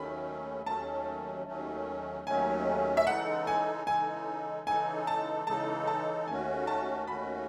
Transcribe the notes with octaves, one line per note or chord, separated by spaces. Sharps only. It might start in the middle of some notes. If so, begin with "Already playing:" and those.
Already playing: D#2 D#3 F#3 A3 C#4 B5
D#2 D#3 F#3 A3 C#4 A5
D#2 D#3 F#3 A3 C#4
D#2 D#3 F#3 A3 C#4 G#5
E5
C#3 E3 G#3 D#4 A4 F#5
G#5
C#3 E3 G#3 D#4 A4 G#5
C#3 E3 G#3 D#4 A4 G#5
A5
C#3 E3 G#3 D#4 A4 A5
A5
D#2 D#3 A3 C#4 F#4 G#5
A5
D#2 D#3 A3 C#4 F#4 B5